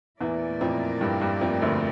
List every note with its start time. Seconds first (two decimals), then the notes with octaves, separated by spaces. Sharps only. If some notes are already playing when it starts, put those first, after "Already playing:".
0.21 E2 A#2 E3 A3 E4 A#4 D5
0.61 F2 F3
1.01 G2 G3
1.21 G2 G3
1.41 F2 F3
1.62 D2 D3